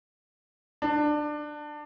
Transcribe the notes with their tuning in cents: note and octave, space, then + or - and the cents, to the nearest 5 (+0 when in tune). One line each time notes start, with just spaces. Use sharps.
D4 +20